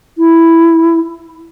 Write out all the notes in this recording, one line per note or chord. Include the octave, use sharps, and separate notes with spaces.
E4